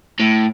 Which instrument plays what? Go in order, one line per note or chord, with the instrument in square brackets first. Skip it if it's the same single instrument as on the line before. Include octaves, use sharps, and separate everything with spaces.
[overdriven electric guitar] A2